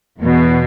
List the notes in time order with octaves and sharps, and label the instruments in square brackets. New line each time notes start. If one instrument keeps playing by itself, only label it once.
[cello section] E2 B2